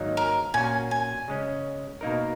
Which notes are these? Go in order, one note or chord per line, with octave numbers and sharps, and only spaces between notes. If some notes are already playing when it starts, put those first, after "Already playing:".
Already playing: G#2 D#3 F#3 A#3 D#4
A#4
A#2 A#3 C#4 F#4 G#5
G#5
C#3 G#3 C#4
B2 A#3 D#4 A#4